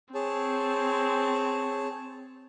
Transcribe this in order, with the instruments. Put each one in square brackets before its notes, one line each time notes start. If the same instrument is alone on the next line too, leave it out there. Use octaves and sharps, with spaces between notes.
[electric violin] C4 [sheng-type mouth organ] G#4 C#5 A5